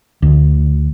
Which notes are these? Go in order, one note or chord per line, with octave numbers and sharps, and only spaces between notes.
D2